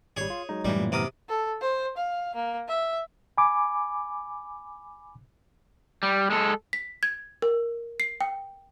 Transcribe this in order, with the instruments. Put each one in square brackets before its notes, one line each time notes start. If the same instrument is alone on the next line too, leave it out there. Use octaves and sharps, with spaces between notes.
[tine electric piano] G#1 G3 [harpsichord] G#4 C#5
[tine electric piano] F4
F#3 G#3 D#4
[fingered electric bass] F#2 A2 E3 [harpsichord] G3
[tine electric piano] A#2
[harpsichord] C3 D6 D#6 [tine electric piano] B3 A#5 F6
[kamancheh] A4
C5
F5
A#3
E5
[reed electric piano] G#5 B5 D6
[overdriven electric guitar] G3
G#3 A4
[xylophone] B6
G#6
A#4
C7
G5